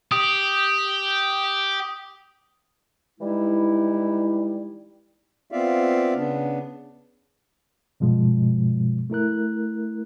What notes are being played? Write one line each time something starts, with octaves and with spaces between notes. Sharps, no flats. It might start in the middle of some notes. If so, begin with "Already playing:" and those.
G4 D#6
E3 G3 G#3 D#4 E4
B3 C4 F4 D5 E5 F5
C#3 B3 D4
G2 B2 F3 G#3
A3 E4 A#4 F#6